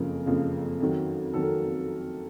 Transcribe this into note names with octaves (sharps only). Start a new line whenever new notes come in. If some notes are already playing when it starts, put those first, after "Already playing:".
Already playing: F#1 F2 C#3 F3 A#4
F#1 F2 C#3 F3
F2 D#3 F#3
F2 D#3 F#3 A4
A#4